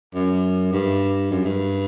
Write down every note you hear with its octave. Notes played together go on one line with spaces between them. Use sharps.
F#2
G2
F#2
G2